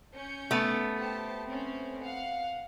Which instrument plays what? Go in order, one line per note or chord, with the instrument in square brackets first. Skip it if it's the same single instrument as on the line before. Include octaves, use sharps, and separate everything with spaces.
[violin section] C#4 G6 C#7
[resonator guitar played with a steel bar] A3 B3
[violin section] G4 C5 A5
C4 C#4
F5 F#5